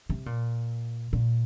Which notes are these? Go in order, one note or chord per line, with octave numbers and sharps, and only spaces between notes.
C3
A#2
A#2